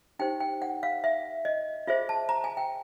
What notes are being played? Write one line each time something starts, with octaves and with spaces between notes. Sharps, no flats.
D#4 G4 C5 G5
G5
F#5
F5
E5
D#5
F4 G#4 C5 E5
A5
A#5
G#5
G5